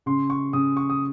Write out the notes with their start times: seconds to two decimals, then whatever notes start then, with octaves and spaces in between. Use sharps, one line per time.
0.06 C#3 C6
0.30 C#6
0.53 C#3 D#6
0.77 C#6
0.90 D#6